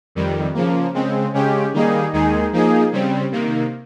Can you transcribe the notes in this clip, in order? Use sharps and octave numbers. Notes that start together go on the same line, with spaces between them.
F2 D#3 G3
C#3 F3 A#3
C#3 G#3 C4
C#3 G#3 C#4 G4
D#3 G3 A#3 D#4 G#4
D#2 D#3 G#3 D#4 G#4
F3 A#3 D#4 G#4
C#3 G3 C4
C3 D#3 A#3